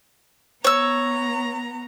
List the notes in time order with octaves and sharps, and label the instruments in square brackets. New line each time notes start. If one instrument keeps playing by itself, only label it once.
[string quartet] B3 A#5 [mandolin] C#5 E6